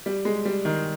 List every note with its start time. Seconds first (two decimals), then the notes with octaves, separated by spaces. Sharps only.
0.06 G3
0.25 G#3
0.45 G3
0.65 D#3